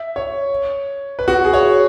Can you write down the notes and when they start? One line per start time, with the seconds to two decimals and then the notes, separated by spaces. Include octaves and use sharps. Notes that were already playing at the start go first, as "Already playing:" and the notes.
Already playing: E5
0.16 C#5
1.19 B4
1.28 F#4
1.45 G#4
1.53 C#5